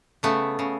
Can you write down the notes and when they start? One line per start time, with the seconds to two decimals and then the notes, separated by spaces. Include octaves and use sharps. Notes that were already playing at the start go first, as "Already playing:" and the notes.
0.23 C#3 A3 B3
0.59 C#3